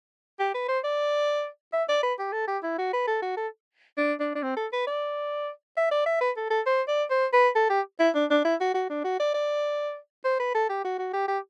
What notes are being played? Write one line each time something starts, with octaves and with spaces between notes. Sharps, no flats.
G4
B4
C5
D5
E5
D5
B4
G4
A4
G4
E4
F#4
B4
A4
F#4
A4
D4
D4
D4
C4
A4
B4
D5
E5
D5
E5
B4
A4
A4
C5
D5
C5
B4
A4
G4
E4
D4
D4
E4
F#4
F#4
D4
F#4
D5
D5
C5
B4
A4
G4
F#4
F#4
G4
G4